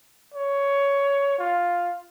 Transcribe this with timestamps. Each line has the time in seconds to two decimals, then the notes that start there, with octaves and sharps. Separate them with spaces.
0.34 C#5
1.38 F4